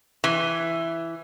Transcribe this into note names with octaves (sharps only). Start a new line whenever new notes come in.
E3